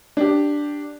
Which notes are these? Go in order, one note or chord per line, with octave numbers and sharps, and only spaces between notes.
D4 G4